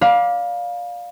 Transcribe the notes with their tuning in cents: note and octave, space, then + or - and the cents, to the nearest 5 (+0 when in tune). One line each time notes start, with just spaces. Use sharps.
D5 +0 F5 +15 B5 -40